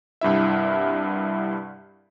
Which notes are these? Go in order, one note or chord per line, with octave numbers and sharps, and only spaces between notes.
C2 G2 E4 E5